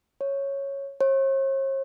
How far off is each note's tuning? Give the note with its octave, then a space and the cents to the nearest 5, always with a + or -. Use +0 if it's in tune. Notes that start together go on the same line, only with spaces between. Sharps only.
C#5 -5
C#5 -45